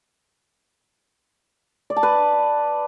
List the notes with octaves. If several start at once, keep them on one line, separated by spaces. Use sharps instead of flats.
D5
A5
B4